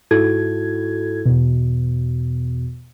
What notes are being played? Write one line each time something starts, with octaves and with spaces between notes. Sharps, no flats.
G#2 E4 F#4 A4 G#6
E2 B2